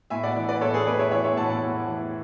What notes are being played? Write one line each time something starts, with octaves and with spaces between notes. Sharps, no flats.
A2 E5 G#5
D5 F#5
E3
B4 D5
A2 A4 C#5
G#4 B4
A2 B4 D5
C#5 E5
E3 C#5 E5
C#5 E5
A2 F#5 A5
F#5 A5
A2
E3